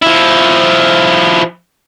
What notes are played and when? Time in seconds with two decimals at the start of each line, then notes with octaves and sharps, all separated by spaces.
0.02 F3 E4